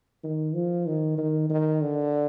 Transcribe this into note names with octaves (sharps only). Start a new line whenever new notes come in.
D#3
F3
D#3
D#3
D#3
D3